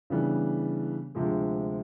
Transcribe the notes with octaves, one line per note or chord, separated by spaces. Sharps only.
C#3 E3 G3 B3 D4
D2 C3 F3 G#3